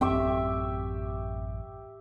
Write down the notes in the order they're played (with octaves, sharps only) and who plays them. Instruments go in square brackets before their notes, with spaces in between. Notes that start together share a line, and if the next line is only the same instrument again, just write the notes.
[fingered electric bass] A1 F#2 C4 [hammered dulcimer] G4 E5 C#6